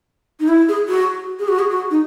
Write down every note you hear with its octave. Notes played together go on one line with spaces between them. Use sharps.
D#4
E4
G#4
F#4
G#4
F#4
G#4
F#4
D#4